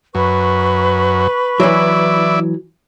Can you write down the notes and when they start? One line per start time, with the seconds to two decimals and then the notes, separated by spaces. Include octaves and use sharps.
0.15 F#2 B4 B5 C#6
1.60 E3 F#3 E4 D5